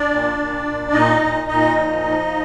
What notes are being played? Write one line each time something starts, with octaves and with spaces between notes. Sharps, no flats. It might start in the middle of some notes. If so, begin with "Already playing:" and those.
Already playing: D4 D5
A#2
A#2
A#2
A#2 D#4 D#5
A#2
A#2 D#4 D#5
F3
F3